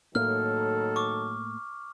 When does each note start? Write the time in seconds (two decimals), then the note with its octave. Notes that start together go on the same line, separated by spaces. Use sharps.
0.15 A2 D#3 F#3 A#3 A4 F6
0.96 C#6 D6